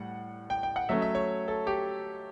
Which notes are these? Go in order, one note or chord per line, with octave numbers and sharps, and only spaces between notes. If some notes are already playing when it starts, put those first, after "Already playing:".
Already playing: A2 G3 F#5
G5
G5
F#5
F#3 A3 C#4 E5
E5
C#5
A4
G4